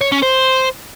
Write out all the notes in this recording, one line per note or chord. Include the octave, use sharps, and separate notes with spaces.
C#5
C#4
C5